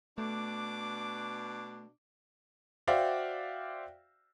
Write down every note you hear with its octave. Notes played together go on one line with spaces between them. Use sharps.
B2 A3 D4 D6
F#4 C5 D5 E5 F5 G5